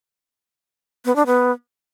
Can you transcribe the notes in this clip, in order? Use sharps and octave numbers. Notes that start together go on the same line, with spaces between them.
B3
D4
B3